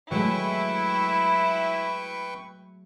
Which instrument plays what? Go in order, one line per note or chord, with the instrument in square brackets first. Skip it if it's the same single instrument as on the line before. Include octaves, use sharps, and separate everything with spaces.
[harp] F#3 G#3 A3 [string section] E4 [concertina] B4 G5 C#6